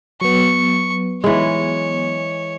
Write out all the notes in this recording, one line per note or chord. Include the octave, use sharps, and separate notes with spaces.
F#3 B3 C#6
E3 G#3 C#5